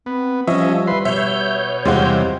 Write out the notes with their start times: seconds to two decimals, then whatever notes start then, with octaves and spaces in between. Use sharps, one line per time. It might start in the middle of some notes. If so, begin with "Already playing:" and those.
0.06 B3 C4
0.47 F3 G3 C#4 D#5 E5
0.87 B4 C6
1.05 B2 C#5 E5 G6
1.85 E2 C3 G3 G#3 F4 F#4 C5